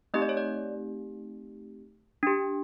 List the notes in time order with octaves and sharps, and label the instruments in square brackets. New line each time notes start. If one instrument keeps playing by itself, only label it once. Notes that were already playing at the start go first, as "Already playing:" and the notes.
[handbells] A3 C4 D#4 G4 D#5
D5
C#5
D5
D4 G4